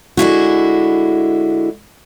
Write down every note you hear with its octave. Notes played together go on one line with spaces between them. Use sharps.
D3 G#3 E4 F#4